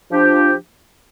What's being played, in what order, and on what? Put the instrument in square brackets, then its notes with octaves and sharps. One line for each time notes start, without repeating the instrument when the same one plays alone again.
[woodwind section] F3 D4 G4